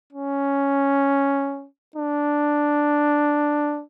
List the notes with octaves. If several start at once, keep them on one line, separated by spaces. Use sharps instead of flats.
C#4
D4